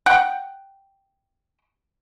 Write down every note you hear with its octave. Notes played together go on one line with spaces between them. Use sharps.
F#5 G5